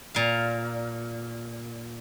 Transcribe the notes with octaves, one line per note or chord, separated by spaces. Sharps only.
A#2 F5